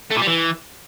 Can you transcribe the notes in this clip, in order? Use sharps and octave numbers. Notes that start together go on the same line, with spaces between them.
A3
A#2
G3
E3